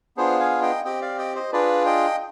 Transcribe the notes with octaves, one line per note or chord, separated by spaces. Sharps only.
B3 D4 F4 G#4 C5
F5 G#5
D#5 G5
C4 G4 D#5 G5
D5 F5
D#5 G5
C5 D#5
D4 F4 G#4 B4 D5
D#5 G5